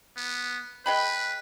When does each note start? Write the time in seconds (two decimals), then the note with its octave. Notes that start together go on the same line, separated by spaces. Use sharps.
0.17 B3
0.86 G#3 B4 G5 B5